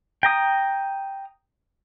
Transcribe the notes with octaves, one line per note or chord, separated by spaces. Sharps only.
G5 A#5 D#6